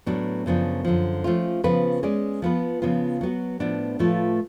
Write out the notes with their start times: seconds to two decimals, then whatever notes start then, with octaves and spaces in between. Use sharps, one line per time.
0.06 A2 F#3 B3 D4
0.46 F#2 C#3 F3 B3 D4
0.85 F#2 D3 F3
1.24 F3 A3 C#4 F4
1.64 C#3 F3 B3 F4 B4
2.03 G#3 C#4 G#4 D5
2.42 F3 B3 F4 B4
2.82 C#3 F3 B3 F4
3.21 F#3 B3 F#4
3.60 A2 F3 B3 D4
3.99 A2 F3 A3 F4 B4